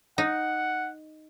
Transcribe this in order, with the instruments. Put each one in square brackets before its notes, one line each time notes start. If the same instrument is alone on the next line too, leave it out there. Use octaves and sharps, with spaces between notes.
[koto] D#4 [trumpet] F#5